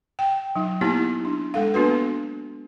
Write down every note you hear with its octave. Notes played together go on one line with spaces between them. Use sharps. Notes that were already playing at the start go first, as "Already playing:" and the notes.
G5
F#3 D#4
A#3 B3 D#4 E4 G4
D4
G#3 A4 F5
A#3 B3 D4 F#4 B4